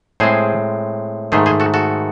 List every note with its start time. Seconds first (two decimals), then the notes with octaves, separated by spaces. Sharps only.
0.20 A2 G#3 C4 G#4 C5
1.32 G#2 D#3 A3 G#4 C5
1.46 G#4 C5
1.60 F#4 A4
1.74 F#4 A4